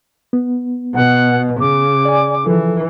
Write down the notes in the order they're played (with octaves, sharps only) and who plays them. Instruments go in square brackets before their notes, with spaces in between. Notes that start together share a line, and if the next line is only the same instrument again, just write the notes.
[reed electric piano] B3
[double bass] B2 [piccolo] F#5
[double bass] C#3 [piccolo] D6
[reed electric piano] D5 G#5
[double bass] E3 [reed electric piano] F3 A4